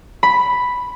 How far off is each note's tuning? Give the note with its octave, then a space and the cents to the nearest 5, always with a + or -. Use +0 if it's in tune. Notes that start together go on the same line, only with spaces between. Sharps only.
B5 +0